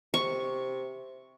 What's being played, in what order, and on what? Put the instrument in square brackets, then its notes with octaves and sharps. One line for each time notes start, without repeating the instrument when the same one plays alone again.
[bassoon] C3 [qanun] C#6